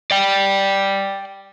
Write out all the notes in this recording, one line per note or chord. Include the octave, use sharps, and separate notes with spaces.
D5 G5